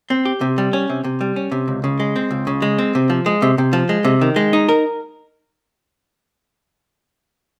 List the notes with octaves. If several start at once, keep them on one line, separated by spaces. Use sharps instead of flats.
C4
G4
C3
G3
C#4
C3
C3
G3
C#4
C3
C#2
C#3
G#3
C4
C#2
C#3
G#3
C4
C3
F3
G#3
C3
C3
F3
G#3
C3
D#3
G#3
D#4
A#4